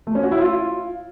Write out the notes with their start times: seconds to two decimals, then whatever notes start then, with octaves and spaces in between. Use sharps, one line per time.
0.07 A3
0.15 C#4
0.23 F#4
0.32 E4
0.40 F4